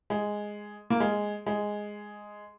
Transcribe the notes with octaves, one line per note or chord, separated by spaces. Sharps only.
G#3
A#3
G#3
G#3